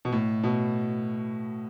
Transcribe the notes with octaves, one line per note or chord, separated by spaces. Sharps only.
B2
A2
B2